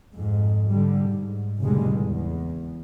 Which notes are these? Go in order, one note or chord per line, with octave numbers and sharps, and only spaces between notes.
F2 G#2
D3 G3
G#2
F1 C#2 A2 D3 G3 G#3
E2